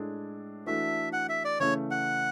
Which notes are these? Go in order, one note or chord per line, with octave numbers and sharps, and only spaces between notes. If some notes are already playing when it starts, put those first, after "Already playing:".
Already playing: A2 G#3 D4 A4
E3 A3 D4 F#4 A4 E5
F#5
E5
D5
C#3 E3 A3 C#4 C#5
F#5